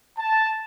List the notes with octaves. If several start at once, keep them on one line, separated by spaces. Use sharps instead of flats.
A5